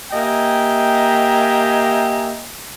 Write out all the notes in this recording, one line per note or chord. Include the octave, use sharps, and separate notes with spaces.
A#3 G4 D#5 E5 G5 G#5